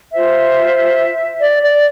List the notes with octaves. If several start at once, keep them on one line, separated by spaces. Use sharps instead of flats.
F4 C5 E5
D5
D5